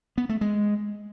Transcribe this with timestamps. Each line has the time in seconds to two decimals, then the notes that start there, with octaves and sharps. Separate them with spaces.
0.18 B3
0.29 A3
0.41 G#3